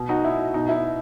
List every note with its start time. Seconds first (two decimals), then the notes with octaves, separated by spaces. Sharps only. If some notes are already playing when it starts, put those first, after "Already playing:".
Already playing: B2
0.09 D#4 F#4
0.24 E4
0.54 B2 D#4
0.69 E4